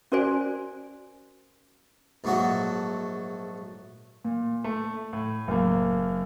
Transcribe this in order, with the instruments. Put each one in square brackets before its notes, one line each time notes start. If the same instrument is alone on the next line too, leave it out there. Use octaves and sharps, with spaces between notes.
[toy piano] C#4 F#4 A#4 C5 D5 G#5
[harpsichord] A#1 G#2 F#3 A3 F#4
[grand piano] A#2
A3
A2
F#1 A#3